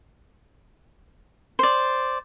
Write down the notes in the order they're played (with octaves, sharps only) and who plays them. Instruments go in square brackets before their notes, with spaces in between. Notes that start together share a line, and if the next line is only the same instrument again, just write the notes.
[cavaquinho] C5 D5